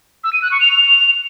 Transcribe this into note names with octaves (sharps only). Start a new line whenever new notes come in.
E6
D#7
F#6
C#6
F7